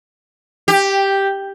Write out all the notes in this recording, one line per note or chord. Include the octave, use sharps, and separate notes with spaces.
G4